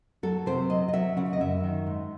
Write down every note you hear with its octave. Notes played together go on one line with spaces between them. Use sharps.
F#3 A4
C3 C5
F#3 D#5
D#5
F#3 E5
C#3 F#5
D#5
F#2 E5
D#3
G#2